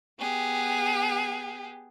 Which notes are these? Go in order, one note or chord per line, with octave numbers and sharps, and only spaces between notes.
B3 G4 G#4